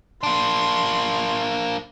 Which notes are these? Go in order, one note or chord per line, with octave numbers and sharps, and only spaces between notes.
A#3 D4 C6